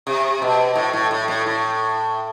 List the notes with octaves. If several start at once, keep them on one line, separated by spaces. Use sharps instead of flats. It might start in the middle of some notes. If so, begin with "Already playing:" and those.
C3
B2
A2
A2
A2
A2
A2